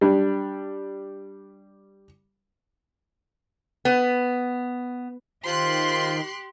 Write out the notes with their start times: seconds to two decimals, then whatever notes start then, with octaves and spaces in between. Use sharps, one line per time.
0.01 G3 D4
3.85 B3
5.46 D#3 F4 G4 C5 C6 F#6